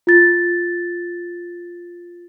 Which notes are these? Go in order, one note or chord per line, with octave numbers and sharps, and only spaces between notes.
F4 A6